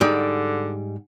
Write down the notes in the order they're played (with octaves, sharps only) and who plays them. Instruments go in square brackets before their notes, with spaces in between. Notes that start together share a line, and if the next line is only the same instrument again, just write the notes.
[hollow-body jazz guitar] G#2 G3 [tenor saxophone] D3